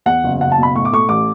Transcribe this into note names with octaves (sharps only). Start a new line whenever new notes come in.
E2 F#5
F#1
F#1 F#5
A5
B2 B5
A2 C#6
D6
A3 C#6
A1 D6